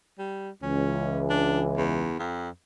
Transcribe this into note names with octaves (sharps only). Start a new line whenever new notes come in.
G3
C#2 E3 C#4
D4
E2
F2